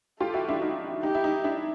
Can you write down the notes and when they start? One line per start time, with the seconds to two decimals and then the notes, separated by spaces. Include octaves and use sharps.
0.20 F4 G4 A4
0.34 E4 F#4
0.49 D4 E4
0.62 D#4
1.03 D#4 G4
1.15 E4
1.24 D#4
1.44 D4 E4